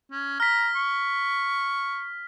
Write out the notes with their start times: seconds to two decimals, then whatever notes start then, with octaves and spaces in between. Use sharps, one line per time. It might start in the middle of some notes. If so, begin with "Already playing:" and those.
0.11 C#4
0.40 A#5 F6 B6
0.75 C#6